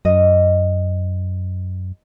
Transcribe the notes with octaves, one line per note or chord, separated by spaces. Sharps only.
F#2 D#5